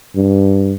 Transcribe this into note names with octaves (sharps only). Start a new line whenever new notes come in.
G2